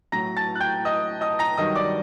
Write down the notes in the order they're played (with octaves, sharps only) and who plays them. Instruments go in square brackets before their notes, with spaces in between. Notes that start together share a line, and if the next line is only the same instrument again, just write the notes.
[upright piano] A2 F#3 A#5 A#6
A5 A6
F#6
G5 G6
D#5 D#6
D#5 D#6
A#5 A#6
G2 D#3 F#3 D#5 D#6
D5 D6